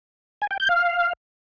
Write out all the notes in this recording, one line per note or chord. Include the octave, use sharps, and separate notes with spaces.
G#5
G5
G6
F5